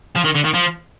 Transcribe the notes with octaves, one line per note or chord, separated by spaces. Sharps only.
F3
D#3
D3
D#3
F3